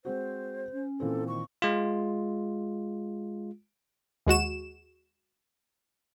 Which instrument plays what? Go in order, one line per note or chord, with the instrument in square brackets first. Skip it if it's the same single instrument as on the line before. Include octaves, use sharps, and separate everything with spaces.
[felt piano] G#3 C4 F#4 [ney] C5
[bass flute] C#4
[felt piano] A#2 E3 C4 [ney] A4
[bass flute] D#3 [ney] C#6
[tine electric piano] G#3 F4
[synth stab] D#2 G#3 F#4 E7